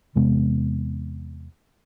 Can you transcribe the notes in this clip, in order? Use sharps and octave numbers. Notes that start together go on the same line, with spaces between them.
E2 C3 G#3 B3